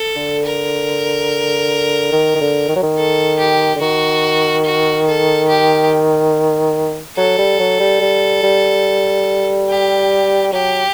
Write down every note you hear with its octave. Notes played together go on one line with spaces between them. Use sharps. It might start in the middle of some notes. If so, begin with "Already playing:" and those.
Already playing: A4
D3
A#4
D#3
D#3
D3
D#3
F#3
D#3
A4
G4
D3
D#3 F#4
F#4
A4
G4
F#3 A4
G3
F#3
G3
G3
G3
G4
F#3 G4